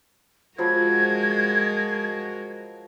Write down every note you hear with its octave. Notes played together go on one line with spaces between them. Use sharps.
F3 F#3 G#3 F#4 A#4 B5 G#6